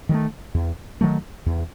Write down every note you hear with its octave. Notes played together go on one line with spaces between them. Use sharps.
D#3 F#3 A3
E2
D#3 F#3 A3
E2